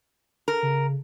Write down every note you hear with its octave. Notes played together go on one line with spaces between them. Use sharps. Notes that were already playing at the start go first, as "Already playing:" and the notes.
A#4
C#3